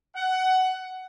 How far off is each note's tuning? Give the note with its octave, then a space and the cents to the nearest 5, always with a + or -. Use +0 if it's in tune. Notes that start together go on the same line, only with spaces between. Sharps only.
F#5 +15